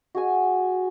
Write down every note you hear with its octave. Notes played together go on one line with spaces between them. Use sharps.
F#4 G#4 G#5